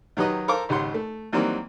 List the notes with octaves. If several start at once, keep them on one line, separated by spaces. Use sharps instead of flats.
D#3 F#3 G4 B4 D#5
A4 A#4 C5 F5 D6
G#1 C#2 G4 F#5 C6
A3
D#3 E3 F#3 G3 A#3 C4